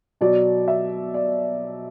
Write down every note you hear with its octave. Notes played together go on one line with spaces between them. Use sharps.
B2 F#3 D5
E5
D5